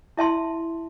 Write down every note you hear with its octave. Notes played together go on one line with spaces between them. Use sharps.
E4 E5 A5 C6